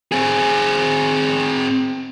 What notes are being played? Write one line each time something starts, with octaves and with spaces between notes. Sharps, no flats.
C4 G#4